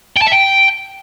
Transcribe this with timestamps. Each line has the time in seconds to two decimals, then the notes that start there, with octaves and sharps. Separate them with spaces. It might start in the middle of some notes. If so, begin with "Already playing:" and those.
0.17 G5
0.22 A5
0.27 E5
0.32 G5